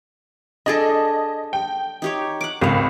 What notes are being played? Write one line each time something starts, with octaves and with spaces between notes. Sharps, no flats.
D4 G#4 A4 D#5
G5
D#4 G4 C#5
F#5 D6
G#1 C#2 D#5 F5